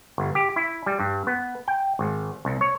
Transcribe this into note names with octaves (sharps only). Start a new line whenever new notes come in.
G1
G4
E4
G3
G2
B3
G5
G#1
C2
C#5